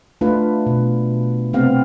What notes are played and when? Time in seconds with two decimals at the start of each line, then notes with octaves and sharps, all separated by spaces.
0.21 A3 D4 F4 B4
0.66 B2
1.53 C3 A3 B3 C4 F5